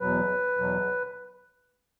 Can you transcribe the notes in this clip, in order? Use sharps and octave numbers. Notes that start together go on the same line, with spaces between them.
E2 B2 F#3 B4
E2 B2 F#3